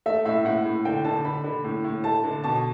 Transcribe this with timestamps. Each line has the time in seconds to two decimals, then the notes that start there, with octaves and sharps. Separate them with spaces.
0.06 A3 E5
0.25 A2 E5
0.45 A2 F#5
0.65 A2
0.85 D3 G5
1.04 D3 A5
1.25 D3 B5
1.44 D3
1.64 A2
1.84 A2
2.04 A3 A5
2.24 D3
2.44 B2 A5